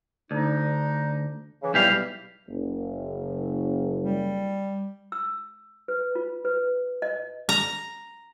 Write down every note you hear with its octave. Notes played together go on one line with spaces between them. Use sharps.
D2 D4 D#4
C#3 E3
B1 E3 G3 G4 F5
F#1
G3
E6
B4
F4
B4
D#5
A#5